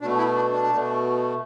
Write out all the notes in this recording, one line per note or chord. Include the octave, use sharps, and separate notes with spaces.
B2 A3 D4
E4
D4
D4
B2 A3